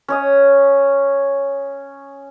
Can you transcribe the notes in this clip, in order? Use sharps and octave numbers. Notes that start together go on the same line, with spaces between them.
C#4 C#5 D#6